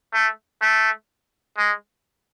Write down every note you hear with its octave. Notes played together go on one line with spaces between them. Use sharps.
A3
A3
G#3